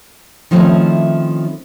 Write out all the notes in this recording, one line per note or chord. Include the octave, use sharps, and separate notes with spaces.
D#3 F3 A3 C4 C#4 E4